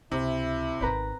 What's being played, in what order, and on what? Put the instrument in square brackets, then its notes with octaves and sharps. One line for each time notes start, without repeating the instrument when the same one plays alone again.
[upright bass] C#2 [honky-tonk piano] C3 [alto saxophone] E4
[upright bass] G#1 D#4 [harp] C4 B4 A#5